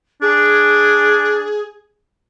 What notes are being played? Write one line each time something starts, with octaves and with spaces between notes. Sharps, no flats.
D4 G#4